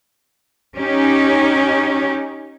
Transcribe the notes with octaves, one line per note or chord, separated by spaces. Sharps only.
C#4 D#4 G4